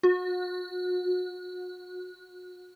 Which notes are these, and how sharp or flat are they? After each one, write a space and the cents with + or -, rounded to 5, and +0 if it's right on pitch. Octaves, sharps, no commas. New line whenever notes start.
F#4 -35